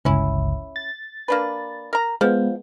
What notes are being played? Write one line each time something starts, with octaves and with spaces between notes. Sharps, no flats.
G1 C#2 C#4 E4
A6
A#3 D4 B4
A#4 A#5
F3 G#3 B3